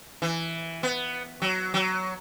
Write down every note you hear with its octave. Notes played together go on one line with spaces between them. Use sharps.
E3
B3
F#3
F#3